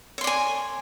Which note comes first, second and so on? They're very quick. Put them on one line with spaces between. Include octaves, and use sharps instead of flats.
C#5 C6 D5 G#5